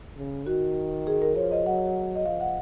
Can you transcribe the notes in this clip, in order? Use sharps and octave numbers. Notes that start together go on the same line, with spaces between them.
C#3
D#3 F#4
G#4
A#4
F3 C#5
D#5
F#3 F#5
D#5
F3 F5
F#5